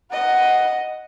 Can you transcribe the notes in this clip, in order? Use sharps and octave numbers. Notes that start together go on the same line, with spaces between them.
D#5 F#5